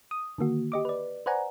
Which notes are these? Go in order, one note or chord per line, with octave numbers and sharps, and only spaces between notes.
D#6
D3 D#3 A#3 F#4
G4 D#5 D6
B4 D5
B4 C5 D5 F#5 G#5 A#5